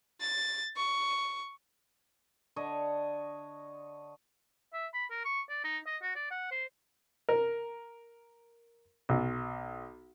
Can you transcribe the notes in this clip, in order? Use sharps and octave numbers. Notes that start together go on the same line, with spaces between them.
A6
C#6
D3 C#5 D#5
E5
B5
A#4
C#6
D5
D#4
D#5
F#4
D5
F#5
C5
A#4
B1